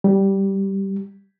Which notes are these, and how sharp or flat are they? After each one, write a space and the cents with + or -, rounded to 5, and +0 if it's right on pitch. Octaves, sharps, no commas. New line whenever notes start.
G3 -10